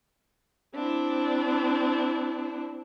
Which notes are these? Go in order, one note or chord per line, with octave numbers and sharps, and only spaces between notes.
C4 D4 E4